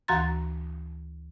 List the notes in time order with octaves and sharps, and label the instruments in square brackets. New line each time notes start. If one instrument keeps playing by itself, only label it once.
[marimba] D2 E3 F#4 A#5 C6 A6